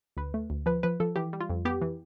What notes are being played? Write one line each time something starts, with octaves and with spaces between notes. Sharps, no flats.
D2 B4
A3
D2
F3 B4
F3 B4
F3 A4
E3 G4
G3
F4
F2
B3 G4
E3